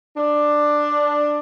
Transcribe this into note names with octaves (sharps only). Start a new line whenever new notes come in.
D4